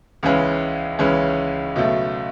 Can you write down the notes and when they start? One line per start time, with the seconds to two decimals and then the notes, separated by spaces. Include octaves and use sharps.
0.23 C#2 C#3 E3 G#3 C#4
0.99 C#2 C#3 E3 G#3 C#4
1.75 C#2 B2 F#3 A3